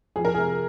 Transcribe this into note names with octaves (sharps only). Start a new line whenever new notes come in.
F2 G#4
A#4
C3 G#4